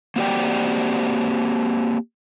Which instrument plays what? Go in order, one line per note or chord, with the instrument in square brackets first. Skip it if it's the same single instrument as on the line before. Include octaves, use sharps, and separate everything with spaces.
[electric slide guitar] A#3 C4 F#4 G4 D5 G5